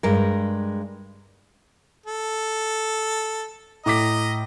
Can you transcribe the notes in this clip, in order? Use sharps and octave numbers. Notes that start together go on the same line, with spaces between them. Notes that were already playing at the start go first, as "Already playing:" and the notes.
G2 G#3 A#4
A4
A2 D#5 A#5 D6 B6